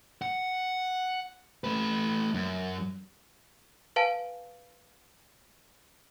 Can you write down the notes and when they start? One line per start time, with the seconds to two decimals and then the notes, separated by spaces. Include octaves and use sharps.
0.22 F#5
1.64 A3 B4
2.34 F#2
3.96 B4 F5 G#5 A5